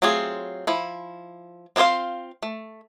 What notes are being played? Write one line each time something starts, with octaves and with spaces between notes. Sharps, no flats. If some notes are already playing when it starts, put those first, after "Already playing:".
F#3 A3 C4 F4 G#4
F3 E4
C4 F4 G#4 C5 F5
A3